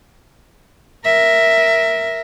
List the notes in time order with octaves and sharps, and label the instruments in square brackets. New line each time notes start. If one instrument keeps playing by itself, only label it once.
[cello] A#4 E5